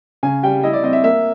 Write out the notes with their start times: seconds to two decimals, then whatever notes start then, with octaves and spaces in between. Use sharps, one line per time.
0.23 C#3 G#5
0.43 G3 G5
0.63 E4 D#5
0.73 D5
0.83 C4 D#5
0.93 E5
1.03 A#3 E5